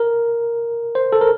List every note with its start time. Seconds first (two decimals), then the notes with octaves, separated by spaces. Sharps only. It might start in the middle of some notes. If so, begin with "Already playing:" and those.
Already playing: A#4
0.95 C5
1.13 A4
1.21 A#4